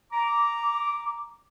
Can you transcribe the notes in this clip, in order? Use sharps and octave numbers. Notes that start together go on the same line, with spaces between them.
A#5 D6